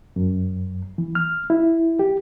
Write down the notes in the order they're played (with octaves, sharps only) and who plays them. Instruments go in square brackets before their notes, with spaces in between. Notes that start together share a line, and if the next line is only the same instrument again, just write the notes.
[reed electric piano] F#2
E3
F6
E4
G4